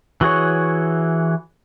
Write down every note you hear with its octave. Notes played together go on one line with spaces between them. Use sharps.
E3 F#4 G#4 C#5